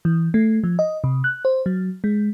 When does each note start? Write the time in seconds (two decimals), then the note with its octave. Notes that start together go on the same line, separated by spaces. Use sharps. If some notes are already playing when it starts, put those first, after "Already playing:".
0.05 E3
0.34 A3
0.64 F3
0.79 D#5
1.04 C3
1.24 F#6
1.45 C5
1.66 F#3
2.04 G#3